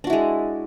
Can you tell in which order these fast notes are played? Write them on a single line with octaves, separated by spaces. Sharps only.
D4 F#4 E4 G#3